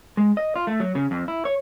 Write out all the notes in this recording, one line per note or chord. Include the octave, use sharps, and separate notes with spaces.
G#3
D#5
F4
A3
F#3
C#3
F2
E4
C#5